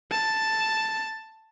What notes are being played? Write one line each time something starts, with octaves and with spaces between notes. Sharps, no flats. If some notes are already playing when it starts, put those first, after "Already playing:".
A5